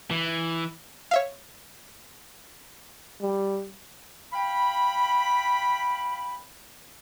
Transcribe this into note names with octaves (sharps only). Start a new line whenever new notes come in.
E3
C#5 E5 F5
G3
F5 G5 B5